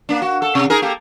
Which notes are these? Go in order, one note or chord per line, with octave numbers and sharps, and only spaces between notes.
A#3 D4
F#4
A4
C3
D#4 G#4 A#4
A#3 G4 A4